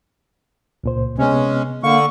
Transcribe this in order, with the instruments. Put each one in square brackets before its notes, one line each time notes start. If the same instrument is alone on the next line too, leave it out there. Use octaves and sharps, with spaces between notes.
[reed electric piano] C#2 A#2 C5
[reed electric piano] C3 B3 [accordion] G#3 C#4
[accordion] D3 C#6 [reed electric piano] A#3 F5